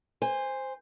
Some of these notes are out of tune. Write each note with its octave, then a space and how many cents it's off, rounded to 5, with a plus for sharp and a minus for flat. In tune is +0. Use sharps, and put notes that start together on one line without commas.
C5 +0 G#5 -25